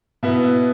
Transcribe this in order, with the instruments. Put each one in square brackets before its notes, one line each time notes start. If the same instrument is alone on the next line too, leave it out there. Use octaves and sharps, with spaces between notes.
[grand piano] B2 B3 E4 E5